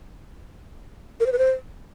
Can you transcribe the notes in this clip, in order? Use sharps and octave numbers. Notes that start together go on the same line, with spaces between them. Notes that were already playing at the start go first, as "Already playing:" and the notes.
A#4
C5
B4
C5